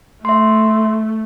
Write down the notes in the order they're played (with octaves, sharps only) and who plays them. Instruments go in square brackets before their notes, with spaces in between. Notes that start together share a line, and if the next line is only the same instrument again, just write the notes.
[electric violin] A3 [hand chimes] E5 C6